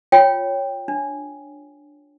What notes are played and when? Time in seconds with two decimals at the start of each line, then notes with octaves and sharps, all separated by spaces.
0.12 F4 C#5 G5
0.88 D4